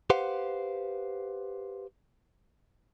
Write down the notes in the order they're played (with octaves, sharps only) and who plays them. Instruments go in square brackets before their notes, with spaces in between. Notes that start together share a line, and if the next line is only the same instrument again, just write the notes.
[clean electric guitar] G4 B4 C5 F5 F#5